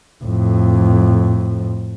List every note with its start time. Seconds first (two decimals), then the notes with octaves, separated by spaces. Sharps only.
0.24 F2 A2